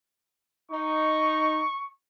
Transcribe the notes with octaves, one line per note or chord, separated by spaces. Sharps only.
D#4 C#6